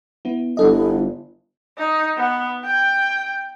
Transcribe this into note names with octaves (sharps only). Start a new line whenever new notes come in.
B3 E4
G1 E4 A4 D#5
D#4
B3
G5